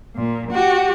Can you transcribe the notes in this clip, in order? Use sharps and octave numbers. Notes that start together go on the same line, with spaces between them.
A#2
F#4 G4